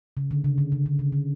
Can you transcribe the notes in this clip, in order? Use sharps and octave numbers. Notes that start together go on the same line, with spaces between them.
C#3
D3
C#3
D3
C#3
D3
C#3
D3